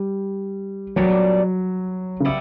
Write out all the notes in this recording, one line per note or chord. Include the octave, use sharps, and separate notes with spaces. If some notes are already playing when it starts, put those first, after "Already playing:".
Already playing: G3
A#2 F#3 G3 B3 D4
C#3
G3 B3 E4